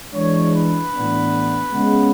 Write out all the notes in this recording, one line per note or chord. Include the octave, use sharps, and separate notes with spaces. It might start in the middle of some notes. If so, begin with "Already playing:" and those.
E3 G#3 D4 C#5
B4
A2 E3 B3 D4
C#3 G#3 B3